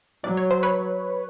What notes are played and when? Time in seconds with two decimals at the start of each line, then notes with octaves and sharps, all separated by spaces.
0.24 F#3 D5
0.37 C#5
0.51 C5
0.63 B4 C#5